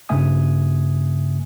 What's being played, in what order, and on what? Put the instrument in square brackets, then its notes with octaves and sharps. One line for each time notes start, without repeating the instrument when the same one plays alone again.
[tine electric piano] G2 C#3 A#3 E5 G#5 D#6